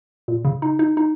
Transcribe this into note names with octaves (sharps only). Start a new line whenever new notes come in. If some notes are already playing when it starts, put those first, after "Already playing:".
A#2
C#3
D#4
D#4
D#4